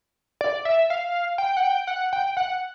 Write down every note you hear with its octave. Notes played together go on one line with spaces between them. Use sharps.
D5
E5
F5
G5
F#5
G5
F#5
G5
F#5